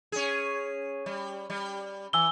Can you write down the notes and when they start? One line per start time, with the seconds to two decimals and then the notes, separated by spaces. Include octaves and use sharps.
0.12 C#4 G#4
1.06 G3
1.50 G3
2.13 E3 G#5 E6 G7